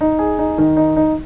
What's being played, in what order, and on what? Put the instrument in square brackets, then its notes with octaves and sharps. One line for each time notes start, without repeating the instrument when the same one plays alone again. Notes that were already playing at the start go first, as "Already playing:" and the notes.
[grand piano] D#4
G#4
D#4
D#3
D#4
D#4